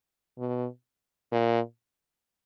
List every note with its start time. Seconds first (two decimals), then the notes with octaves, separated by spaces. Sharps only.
0.38 B2
1.32 A#2